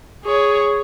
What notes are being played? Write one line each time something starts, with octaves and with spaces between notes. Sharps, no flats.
G#4 C#5